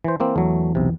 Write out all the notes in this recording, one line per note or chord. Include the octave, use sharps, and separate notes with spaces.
E3 C5
E3 A#3 C4
E2 F#3 A3
B1 C3